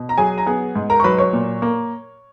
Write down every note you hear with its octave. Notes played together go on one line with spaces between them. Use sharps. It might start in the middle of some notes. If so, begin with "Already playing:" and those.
Already playing: B2
A#5
F#3 G#4 G#5
A#5
B3 G#4 G#5
G#2
A#4 A#5
C#6
F#3 B4 B5
C#5 C#6
A#2
A#3